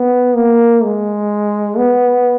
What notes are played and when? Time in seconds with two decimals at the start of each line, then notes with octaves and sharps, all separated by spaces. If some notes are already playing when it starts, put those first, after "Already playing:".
Already playing: B3
0.35 A#3
0.84 G#3
1.78 B3